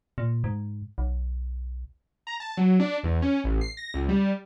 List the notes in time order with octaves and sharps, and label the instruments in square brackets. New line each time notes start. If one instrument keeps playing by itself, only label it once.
[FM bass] A#2
G#2
B1
[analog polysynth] A#5
A5
F#3
D4
E2
C#4
A1
C7
A#6
C#2
G3